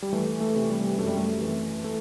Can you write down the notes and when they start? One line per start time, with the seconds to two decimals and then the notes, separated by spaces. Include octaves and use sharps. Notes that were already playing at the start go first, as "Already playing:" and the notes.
0.02 G3
0.13 E3 A3
0.40 A3
0.56 C3
0.70 G3
0.98 F#2 A3
1.07 G3
1.17 A3
1.41 E3
1.84 A3